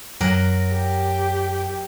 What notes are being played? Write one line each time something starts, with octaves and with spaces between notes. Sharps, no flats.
F#2 F#3 A#4
G4